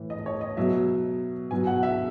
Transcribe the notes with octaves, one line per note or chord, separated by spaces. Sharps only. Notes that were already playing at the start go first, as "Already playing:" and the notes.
Already playing: A2 E3
D#5
C#5
D#5
B2 F#3 E5
B2 F#3 G#5
F#5
E5